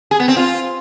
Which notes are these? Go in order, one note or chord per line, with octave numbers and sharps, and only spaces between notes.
G#4
B3
C4
F4